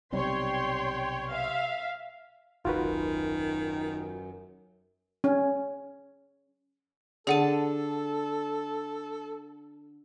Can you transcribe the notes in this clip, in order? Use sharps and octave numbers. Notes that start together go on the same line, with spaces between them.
B1 C3 G3 C#5 G5 C6
E5 F5
D#1 G#1 F#2 D#3 F4 F#4 B4
C#4
D3 G#4 A4 F#5 A5 D#7